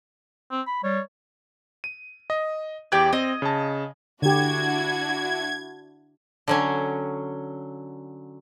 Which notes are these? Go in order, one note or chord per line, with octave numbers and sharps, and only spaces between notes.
C4
B5
G3 C#5
D#7
D#5
E2 G4 D5 G5 G#6
C4 D#5
C#3 A5
D3 D4 E4 F#4 G4 G#6
D3 F#3 C#4